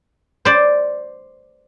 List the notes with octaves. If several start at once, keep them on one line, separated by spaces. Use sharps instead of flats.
C5 D5